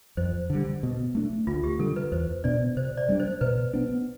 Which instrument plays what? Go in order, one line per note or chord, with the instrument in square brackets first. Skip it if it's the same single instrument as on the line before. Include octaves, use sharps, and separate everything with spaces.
[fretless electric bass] F2 [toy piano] C5
[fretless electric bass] D3 G3
B2
A3 D4
[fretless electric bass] D2 [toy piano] F4
[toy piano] G4
[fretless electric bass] D3 G3 [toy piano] A4
[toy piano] B4
[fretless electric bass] E2 [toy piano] C5
[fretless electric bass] B2 B3 D4 [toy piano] D5
[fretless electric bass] C3 [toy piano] C5
[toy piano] D5
[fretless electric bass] G3 B3 D4
[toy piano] C5
[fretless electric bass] B2 [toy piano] B4
[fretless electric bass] B3 D4